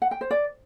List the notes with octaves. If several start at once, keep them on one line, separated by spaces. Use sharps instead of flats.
F#5
G5
C5
D5